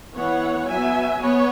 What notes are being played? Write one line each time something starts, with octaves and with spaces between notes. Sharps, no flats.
E3 B3 C#5 F#5
F#3 B3 E5 G#5
B3 C#5